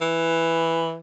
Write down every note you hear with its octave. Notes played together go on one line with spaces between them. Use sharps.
E3